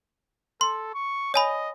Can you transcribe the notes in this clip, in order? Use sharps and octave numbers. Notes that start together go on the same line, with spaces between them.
A4 C6
C#6
C#5 D#5 G#5 B5